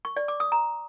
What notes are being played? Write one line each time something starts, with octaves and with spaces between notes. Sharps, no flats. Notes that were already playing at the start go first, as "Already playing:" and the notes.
C#6
D5
D6
D#6
A#5